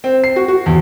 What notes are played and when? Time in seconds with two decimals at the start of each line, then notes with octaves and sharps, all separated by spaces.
0.04 C4
0.24 C7
0.36 F#4
0.48 F#4
0.66 E2